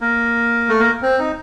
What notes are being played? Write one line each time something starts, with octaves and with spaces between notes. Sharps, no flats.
A#3
A3
A#3
C4
D#4